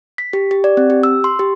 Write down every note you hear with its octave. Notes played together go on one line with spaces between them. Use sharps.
B6
G4
G4
D5
C4
G4
E6
C6
G4